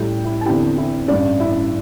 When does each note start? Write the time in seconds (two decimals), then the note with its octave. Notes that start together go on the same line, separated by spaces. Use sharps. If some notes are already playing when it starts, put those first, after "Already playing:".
Already playing: A2 G3 E4 G4 G5
0.25 E4 E5
0.41 A5
0.46 E2 D3 C4 E4 G4 G5
0.78 E4 E5
1.08 A1 G2 G3 D4 D5
1.40 E4 E5